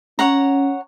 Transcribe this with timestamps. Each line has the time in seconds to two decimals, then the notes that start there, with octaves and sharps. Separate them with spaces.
0.19 C#4 C#5 F#5 A#5